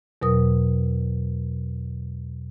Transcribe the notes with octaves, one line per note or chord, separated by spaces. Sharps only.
E2 B2 F#3 A#4 D#6